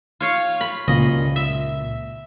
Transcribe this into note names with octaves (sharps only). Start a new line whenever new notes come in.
F4 C#5 F5
B5
C#2 A#2 D#5
E5